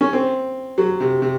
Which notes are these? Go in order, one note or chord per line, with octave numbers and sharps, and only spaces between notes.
C#4
C4
F#3
C3
C3